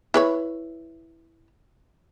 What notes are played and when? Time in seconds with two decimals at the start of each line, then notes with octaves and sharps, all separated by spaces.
0.14 E4 B4 C#5